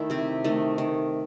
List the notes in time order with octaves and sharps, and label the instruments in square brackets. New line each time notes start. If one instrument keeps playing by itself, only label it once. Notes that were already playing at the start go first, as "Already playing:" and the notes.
Already playing: [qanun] D#3 A3 E4
C3 C4
D#3 A3
D#3